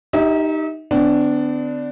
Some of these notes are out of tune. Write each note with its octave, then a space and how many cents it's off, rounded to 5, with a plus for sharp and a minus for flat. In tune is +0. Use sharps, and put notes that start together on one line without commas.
D#4 +0 G4 +0 E5 -40
D3 +0 B3 +45 D4 +0